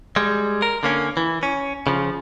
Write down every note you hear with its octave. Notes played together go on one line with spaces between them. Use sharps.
G3 G#3
A#4
D3 A#3 C#4
E3
C#4
C#3 F3